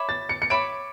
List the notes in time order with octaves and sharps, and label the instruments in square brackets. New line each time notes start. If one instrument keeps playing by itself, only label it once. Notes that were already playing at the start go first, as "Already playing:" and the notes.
Already playing: [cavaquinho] C#5 E5 B5 D6
[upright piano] A6
C#7
C#7
[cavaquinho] C#5 E5 B5 D6 [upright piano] D7